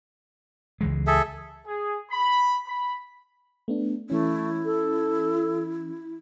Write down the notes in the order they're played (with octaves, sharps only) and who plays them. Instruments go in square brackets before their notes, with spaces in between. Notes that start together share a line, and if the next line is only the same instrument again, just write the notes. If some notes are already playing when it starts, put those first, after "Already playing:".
[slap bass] C#2 E3 G#3
[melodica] G#4 A4 E5
[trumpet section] G#4
B5
B5
[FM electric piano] A3 B3 D4
[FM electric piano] E3 C#4 [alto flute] A3 [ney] E4
[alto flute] A4